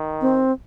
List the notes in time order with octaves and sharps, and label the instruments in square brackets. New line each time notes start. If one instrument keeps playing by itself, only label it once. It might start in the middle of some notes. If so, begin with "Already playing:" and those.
Already playing: [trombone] D#3
[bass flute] C4